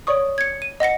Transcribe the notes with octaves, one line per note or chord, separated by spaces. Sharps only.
C#5 D5 C#6 D#6
G#6 C#7
D#7
D#5 F#5 A#6 C#7